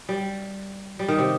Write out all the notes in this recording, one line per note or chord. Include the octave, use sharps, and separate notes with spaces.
G3
G3
D#3
C3